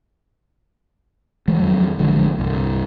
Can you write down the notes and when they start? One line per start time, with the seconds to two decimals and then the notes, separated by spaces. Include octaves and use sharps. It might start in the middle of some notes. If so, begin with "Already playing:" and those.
1.48 E3 G#3 A3
1.60 F2 D#3 F3 F#3
1.99 A1 D3 F3 G#3
2.38 C2 G2